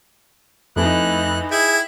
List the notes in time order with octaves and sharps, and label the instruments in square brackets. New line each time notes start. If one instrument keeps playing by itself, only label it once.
[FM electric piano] F2 A3 E4 [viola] E3 D#4 [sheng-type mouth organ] F#6
[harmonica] E4 [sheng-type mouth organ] G#4 [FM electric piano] G5 G#6